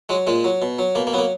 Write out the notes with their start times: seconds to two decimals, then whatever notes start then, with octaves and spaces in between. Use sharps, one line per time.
0.09 F#3 G#3
0.27 A#2 G#3
0.44 F#3
0.62 B2
0.79 F#3
0.95 B2 A#3
1.07 A#3
1.13 F#3 B3
1.19 A#3